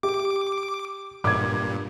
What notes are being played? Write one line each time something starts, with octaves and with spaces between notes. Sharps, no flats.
G4 D6
G2 A#2 D6 G#6